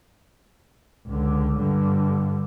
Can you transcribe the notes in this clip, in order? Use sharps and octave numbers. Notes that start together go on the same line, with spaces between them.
C#2 D3
G2 D3